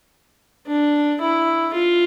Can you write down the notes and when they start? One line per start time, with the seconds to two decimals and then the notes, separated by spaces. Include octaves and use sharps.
0.67 D4
1.21 E4
1.74 F4